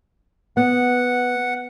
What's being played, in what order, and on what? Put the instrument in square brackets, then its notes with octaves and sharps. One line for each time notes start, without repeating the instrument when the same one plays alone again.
[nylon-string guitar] B3 [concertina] F#5